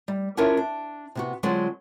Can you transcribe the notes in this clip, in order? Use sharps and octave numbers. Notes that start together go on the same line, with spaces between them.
G3
C#4 D4 E4 F4 A#4 C#5
D4
C3 B3 F#4
D3 F#3 G#3 C4 F4 C5